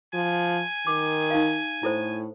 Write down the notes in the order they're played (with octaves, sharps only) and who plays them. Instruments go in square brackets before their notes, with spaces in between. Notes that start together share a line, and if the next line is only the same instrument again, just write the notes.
[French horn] F3 [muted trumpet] G#5
[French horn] D#3 [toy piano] D6
[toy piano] D#4 F5
[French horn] A2 [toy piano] E4 A4 C5